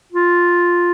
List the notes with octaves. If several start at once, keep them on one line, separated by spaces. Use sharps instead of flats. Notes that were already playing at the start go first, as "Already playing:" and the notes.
F4